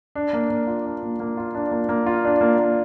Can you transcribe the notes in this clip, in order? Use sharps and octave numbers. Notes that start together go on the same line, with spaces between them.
D4
A#3
A#3
F4
D4
A#3
A#3
F4
D4
A#3
A#3
F4
D4
A#3
A#3